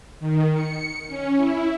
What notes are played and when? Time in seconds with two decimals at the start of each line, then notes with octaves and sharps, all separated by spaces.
0.20 D#3
0.53 C#7
1.08 C#4
1.36 E4